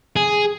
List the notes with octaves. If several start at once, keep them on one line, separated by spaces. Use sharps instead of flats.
G#4